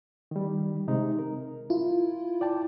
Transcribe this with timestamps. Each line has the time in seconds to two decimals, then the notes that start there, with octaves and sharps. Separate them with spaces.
0.31 D#3 G3
0.88 C3 G#3 D#4
1.19 A#4
1.70 E4 F4
2.41 D5 G5 A5